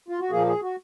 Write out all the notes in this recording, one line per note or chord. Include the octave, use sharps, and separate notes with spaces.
F4
F#4
A#2 F3 A#3 G#4
G#4
F#4